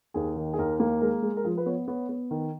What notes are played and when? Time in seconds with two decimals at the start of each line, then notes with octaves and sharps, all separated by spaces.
0.14 D#2 G#4
0.36 D#3
0.54 G#4
0.58 D#2 A#4
0.80 A#3
1.01 G#3 A#4
1.22 G#3
1.37 A#4
1.44 F3 G#4
1.58 B4
1.66 B3 C#5
1.88 B3 C#5
2.09 B3
2.31 D#3